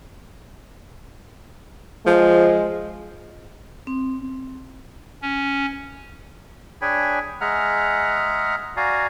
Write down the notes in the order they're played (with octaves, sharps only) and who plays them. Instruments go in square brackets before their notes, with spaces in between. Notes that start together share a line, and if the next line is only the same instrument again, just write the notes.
[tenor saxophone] F3 [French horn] G#3
[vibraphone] C4
[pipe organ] C#4
[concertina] D4 G#4 C#5 G5 G#5 B5
G#3 G#4 E5 F#5 A#5 F6
F#4 D5 F5 G#5 A#5